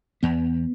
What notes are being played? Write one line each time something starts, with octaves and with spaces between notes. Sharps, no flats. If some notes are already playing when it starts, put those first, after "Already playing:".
E2 B3